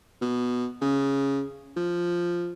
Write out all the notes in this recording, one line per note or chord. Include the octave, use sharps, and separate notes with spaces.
B2
C#3
F3